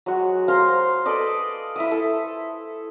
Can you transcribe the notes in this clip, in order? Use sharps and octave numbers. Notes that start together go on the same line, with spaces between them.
F#3 G#3 F#4
C5 F5 A#5 C6
A4 B4 D5 D#5
E4 E5 D#6
A4